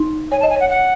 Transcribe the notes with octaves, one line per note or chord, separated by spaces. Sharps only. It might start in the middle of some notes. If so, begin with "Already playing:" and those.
Already playing: D#4
C#5 G#5
A5
D#5
G#5
C#5 F#5
F#5